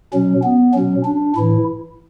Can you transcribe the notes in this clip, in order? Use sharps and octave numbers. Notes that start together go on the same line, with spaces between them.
B2 F#3 C#4
B3
B2 F#3 C#4
D4
A2 E3 E4